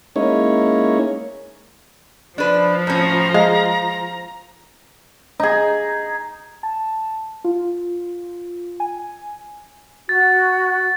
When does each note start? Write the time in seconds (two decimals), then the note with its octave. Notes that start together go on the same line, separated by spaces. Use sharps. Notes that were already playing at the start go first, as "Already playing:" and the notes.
0.16 G#3 A#3 C#4 D#4 E4 C#5
2.38 F3 D4 B4
2.87 A2 C#4 A#5
3.34 G#3 F5
5.40 D#4 G#4
6.63 A5
7.44 F4
8.80 G#5
10.09 F#4 A6